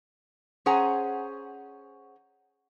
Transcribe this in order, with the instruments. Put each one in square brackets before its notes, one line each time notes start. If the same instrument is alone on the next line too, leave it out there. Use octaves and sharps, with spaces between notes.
[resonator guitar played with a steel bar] C#4 G#4 C5 F#5 G#5 A#5